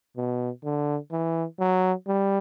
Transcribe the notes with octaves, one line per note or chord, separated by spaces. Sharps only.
B2
D3
E3
F#3
G3